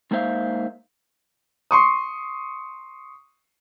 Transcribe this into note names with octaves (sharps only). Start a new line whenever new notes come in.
G#3 A#3 D#4 C5 E5 F5
C6 C#6 D#6